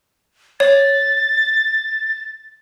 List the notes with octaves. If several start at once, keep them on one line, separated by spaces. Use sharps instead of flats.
C#5 A6